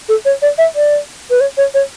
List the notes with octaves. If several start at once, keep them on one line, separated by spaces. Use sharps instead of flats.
A4
C#5
D5
E5
D5
B4
C#5
C#5
C#5